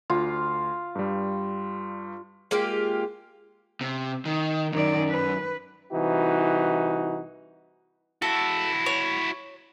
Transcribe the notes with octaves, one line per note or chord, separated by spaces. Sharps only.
D2 F4
G2 G3
G#3 A#3 F4 G4
C3
D#3
C2 F#2 D#3 D5
B4
C2 E3 D#4 F#4
E4 F#4 A4
C#5